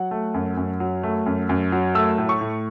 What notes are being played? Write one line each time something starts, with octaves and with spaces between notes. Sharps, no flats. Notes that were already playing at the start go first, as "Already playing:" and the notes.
Already playing: F#3 F#5
A3
F#2
F#2
F#3
A3
F#2
F#2
F#3
A3 E6
A2
C#6
A2